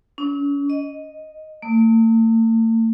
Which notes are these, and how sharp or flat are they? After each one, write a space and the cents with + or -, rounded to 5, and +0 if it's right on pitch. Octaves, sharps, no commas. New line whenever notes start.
C#4 +35
D#5 -5
A3 +45